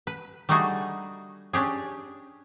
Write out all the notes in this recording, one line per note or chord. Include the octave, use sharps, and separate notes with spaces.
B4
G3 A3 D4 D#4 F#4 G#4
C#4 D4 G4 G#4